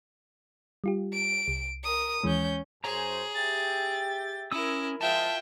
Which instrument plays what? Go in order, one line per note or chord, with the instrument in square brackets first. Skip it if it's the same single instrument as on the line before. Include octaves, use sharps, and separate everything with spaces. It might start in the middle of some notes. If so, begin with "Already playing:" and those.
[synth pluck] G3 F4 G4
[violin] D7
[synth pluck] C2
[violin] A#4 D#6
[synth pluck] D#2 E3 G#3 [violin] C#4 G6
[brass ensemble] F#2 C5 G#5 [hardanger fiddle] G#4 [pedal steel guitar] C#5 A#5
[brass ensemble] G4 E5 G5 [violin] A6
[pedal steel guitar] C#4 D#6 E6 [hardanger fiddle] E4 A#4
[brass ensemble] F3 G#3 [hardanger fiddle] F4 [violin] E5 G5 [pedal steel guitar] A5